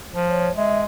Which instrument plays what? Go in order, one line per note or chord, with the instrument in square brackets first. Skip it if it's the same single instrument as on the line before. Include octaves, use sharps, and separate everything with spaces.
[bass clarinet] F3
[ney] C#5
[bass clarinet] G#3 [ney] E5